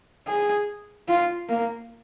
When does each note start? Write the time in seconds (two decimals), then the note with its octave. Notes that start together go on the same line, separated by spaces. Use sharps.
0.27 G#4
1.08 F4
1.49 A#3